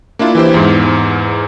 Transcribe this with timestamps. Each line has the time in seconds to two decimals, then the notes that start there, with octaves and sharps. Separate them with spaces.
0.19 A#3 D4 E4 F4
0.35 E3 E4 G4 C5
0.54 E2 G#2